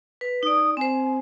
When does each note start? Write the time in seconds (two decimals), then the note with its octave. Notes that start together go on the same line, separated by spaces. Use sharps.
0.21 B4
0.43 D#4 D5 D#6
0.77 C4 C5 G#5